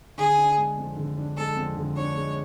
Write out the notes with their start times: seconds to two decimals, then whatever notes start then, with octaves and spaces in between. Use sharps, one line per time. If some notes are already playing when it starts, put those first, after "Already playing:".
0.18 D3 G#4
0.38 D4
0.58 G#3
0.78 F2
0.97 D3
1.17 D4
1.37 G#3 A4
1.56 F2
1.76 D3
1.96 D4 C#5
2.15 G#3